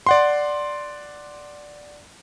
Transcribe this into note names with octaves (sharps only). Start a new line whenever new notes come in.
D5 F#5 C6